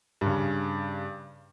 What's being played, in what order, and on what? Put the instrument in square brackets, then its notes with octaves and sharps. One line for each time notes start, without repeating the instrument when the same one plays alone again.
[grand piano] G2 C#3